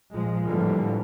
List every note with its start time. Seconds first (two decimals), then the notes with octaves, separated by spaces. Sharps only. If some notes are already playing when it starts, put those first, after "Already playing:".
0.12 A#2 F3 G#3
0.47 A2 D3 E3 F3 G3 A#3